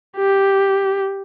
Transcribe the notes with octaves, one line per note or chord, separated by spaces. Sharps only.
G4